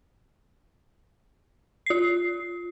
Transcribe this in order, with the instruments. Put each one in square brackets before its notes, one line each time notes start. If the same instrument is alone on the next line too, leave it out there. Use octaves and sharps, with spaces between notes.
[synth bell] F4 C7